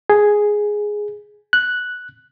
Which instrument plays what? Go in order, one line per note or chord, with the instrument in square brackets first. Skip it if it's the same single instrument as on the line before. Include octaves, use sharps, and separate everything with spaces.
[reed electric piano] G#4
F#6